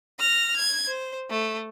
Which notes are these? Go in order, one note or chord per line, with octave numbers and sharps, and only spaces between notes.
F6 A#6
G#6
C5
A3